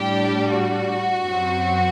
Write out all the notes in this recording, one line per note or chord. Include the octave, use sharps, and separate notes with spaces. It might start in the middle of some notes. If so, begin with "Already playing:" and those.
Already playing: A2 G3 D4 G4
F#4
F#2 F#3 C4